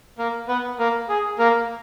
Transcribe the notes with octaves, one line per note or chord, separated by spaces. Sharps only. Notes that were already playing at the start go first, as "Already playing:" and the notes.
A#3 A#4
B3 B4
A#3 A#4
G#4
A#3 A#4